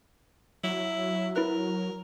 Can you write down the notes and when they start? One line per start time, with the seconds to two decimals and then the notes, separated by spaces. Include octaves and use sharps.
0.64 F#3 E4
1.36 E4 A#4 B4 F#6